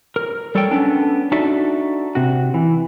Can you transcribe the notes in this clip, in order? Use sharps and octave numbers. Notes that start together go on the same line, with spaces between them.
A#4
G3 A4 A#4 C#5 D5 G5
B3 C#4 D4 A4
D4 D#4 F#4 A4 D5 E5
C3 F#4
E3